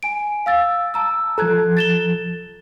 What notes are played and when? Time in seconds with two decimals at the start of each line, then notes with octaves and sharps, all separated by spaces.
0.03 G#5 D7
0.46 F5 E6 A6
0.94 A5 A#5 E6
1.38 F3 A4 A#5 F#6 G#6
1.77 A6 E7 G7